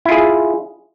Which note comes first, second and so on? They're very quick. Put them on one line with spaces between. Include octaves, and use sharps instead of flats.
E4 F4 G#4